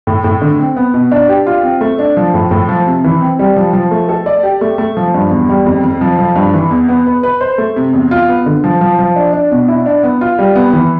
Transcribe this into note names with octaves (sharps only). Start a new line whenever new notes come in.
A2
A2
D3
C4
B3
B2
D4
G4
F4
C4
A3
D4
F3
A2
A2
F3
C3
E3
C4
G3
F3
F3
A3
A4
D5
G4
A3
A3
F3
G2
E2
G3
F2
F2
F3
F3
G2
E3
E2
B3
B4
B4
C5
A3
C3
E2
F4
B3
D3
F3
F3
F3
D4
D4
B2
E4
D4
B3
F4
G3
B3
E3